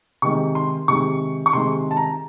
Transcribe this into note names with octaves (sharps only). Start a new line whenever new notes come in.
C3 D#3 G#3 C#6
C6
C3 D#3 G#3 C#6
C#6
C3 D#3 G#3 C6
A5
A#5